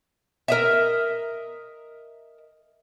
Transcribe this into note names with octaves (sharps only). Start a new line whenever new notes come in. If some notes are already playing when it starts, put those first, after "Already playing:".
A#4 D#5 E5